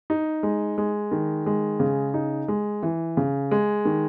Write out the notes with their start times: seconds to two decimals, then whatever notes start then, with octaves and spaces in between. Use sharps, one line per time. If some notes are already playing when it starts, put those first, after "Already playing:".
0.10 D#4
0.43 G#3
0.78 G#3
1.12 D#3
1.46 G#3
1.80 C#3
2.14 D#4
2.48 G#3
2.83 E3
3.17 C#3
3.51 G#3
3.85 D#3